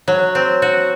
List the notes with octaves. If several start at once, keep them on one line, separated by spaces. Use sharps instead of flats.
F#3
C4
F#4